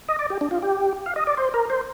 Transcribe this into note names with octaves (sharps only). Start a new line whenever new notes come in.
D#5
D5
G4
D4
F4
G4
F5
D#5
D5
C5
A#4
C5